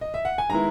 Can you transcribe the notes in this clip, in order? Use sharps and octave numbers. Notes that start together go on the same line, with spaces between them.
D#5
E5
F#5
G#5
D#3 G#3 B3 E4 A#5